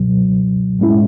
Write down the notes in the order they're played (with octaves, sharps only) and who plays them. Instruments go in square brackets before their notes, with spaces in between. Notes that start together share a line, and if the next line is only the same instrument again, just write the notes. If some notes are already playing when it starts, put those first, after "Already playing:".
Already playing: [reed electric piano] C#2 B2 F#3
A2 G#3 C#4 E4